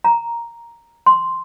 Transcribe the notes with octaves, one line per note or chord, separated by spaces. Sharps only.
A#5
C6